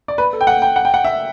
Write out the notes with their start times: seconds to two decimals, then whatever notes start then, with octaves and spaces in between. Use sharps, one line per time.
0.08 D5
0.18 B4
0.33 A4
0.41 G5
0.47 F#5
0.62 G5
0.76 F#5
0.85 G5
0.94 F#5
1.04 E5